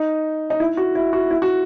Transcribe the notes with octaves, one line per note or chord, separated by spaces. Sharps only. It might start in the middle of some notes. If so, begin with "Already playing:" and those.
Already playing: D#4
D#4
E4
F#4
E4
F#4
E4
F#4